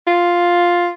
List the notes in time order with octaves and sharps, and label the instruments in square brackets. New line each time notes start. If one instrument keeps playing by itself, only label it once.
[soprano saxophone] F4